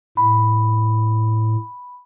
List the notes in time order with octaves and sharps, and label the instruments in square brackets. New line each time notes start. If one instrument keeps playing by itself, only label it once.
[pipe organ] A2 [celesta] B5